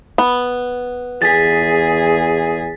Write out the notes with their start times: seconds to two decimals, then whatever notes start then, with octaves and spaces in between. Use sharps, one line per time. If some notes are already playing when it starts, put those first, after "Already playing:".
0.18 B3
1.22 E2 G#4 A6 B6